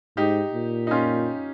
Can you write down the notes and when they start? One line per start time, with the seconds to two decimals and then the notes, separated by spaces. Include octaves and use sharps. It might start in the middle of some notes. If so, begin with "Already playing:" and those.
0.17 G#2 D#4 G4
0.54 A#2
0.87 D#4
0.91 C#4 F4